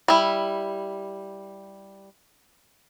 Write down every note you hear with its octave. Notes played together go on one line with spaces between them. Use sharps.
G3 E4